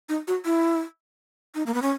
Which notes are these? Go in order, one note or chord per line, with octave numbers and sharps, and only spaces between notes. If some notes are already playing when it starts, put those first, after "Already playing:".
D#4
F#4
E4
D#4
A#3
B3
C#4